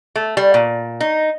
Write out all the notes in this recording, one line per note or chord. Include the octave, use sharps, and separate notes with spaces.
A3
G3
A#2
D#4